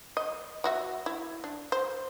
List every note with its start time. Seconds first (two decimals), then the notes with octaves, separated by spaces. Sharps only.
0.17 D#5
0.64 F#3 F#4 E5
1.06 E4
1.44 D4
1.72 C5